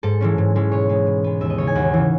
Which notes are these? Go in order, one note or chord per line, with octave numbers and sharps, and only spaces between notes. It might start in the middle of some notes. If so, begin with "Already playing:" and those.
G#2 A4
E3 G#3 C#4
G#2
E3 G#3 C#4
B2 C#5
G#3 B3
B2
G#3 B3
D#2 E5
D#5
C#3 E3 C#5
G#5
D#2 F#5
C#3 E3